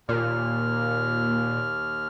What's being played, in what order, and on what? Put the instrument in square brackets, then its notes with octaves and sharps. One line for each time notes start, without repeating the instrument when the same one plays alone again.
[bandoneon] D#2 F6 [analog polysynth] A#2